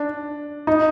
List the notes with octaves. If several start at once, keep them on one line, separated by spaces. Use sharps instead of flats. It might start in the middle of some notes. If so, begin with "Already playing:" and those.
Already playing: D4
D#4